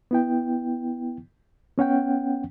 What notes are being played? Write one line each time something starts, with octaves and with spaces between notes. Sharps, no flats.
B3 E4 G5
B3 C#4 F#5 G5